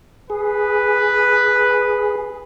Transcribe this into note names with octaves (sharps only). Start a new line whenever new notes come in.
G#4 B4